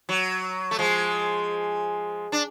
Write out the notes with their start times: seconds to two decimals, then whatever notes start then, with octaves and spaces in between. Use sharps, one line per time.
0.09 F#3
0.71 A3
0.79 F3 G#3
2.32 D4